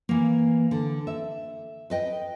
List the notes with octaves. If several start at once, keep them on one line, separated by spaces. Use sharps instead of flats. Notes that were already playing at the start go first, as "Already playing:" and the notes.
E3 A#3
D3
E5
B4 D#5 G5